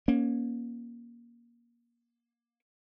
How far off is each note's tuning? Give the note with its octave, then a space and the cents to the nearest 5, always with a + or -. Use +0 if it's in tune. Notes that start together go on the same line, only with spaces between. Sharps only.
A#3 +25 C#4 +0